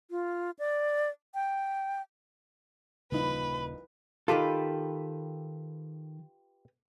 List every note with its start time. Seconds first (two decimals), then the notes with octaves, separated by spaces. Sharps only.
0.11 F4
0.59 D5
1.34 G5
3.12 D#1 C2 C#3 F3 A#3 D#4 B4 B5
4.28 D#3 F4 G4 A4 B4 D6